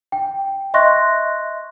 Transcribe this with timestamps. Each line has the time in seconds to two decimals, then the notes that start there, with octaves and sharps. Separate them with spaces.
0.12 G5
0.74 D#5 E5 C6 C#6 F#6 A#6